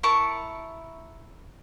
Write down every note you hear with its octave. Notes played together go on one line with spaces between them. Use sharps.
E4 A#4 A5 C#6